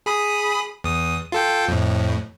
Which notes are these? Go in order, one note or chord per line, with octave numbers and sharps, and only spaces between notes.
G#4 B5 D#6
E2 D#6
F4 A4 G5
F2 A2